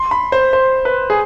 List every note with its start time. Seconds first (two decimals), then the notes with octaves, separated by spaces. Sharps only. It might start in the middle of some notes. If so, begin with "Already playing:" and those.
Already playing: C6
0.11 B5
0.32 C5
0.53 C5
0.85 B4
1.10 G#4